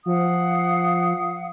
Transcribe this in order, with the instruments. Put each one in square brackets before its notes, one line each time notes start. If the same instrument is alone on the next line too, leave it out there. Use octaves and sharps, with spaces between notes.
[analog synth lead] F3 [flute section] F5 F#5 D#6